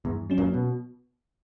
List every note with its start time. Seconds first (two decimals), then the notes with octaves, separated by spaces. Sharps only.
0.05 E2 G2
0.30 F#3 C#4
0.38 F#2 A#2
0.54 B2